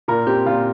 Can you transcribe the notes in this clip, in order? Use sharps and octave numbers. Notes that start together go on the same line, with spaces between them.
A#2 A#4
C4 G4
A#2 F4